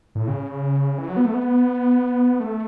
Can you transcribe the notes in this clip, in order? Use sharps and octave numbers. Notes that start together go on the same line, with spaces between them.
A2
C#3
E3
F#3
B3
A3
B3
A3